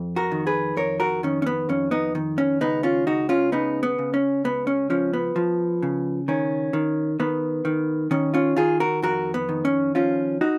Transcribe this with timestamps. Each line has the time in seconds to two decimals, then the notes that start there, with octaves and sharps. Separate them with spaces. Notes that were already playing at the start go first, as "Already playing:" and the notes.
Already playing: F2
0.16 F#4 A#4
0.31 D#3
0.47 G#4 B4
0.77 F2 A#4 C#5
1.00 F#4 A#4
1.23 D#3 C#4
1.42 C#4
1.46 B3
1.69 F2 C#4
1.91 B3 D#4
2.15 D#3
2.38 C#4
2.61 C#2 B3 D#4
2.83 C#4 F4
3.07 C#2 D#4 F#4
3.29 C#4 F4
3.52 C#3 B3 D#4
3.83 B3
3.98 C#3
4.14 C#4
4.44 C#2 B3
4.67 C#4
4.90 F3 C#4
5.13 B3
5.36 F3
5.83 C#3
6.28 D#3 C#4
6.73 D#3
7.20 D#3 B3
7.65 D#3
8.11 D#3 C#4
8.34 C#4 F4
8.57 D#3 F4 G#4
8.80 F#4 A#4
9.02 F2 F#4 A#4
9.34 B3
9.49 D#3
9.65 C#4
9.95 F3 C#4 F4
10.41 D#4 F#4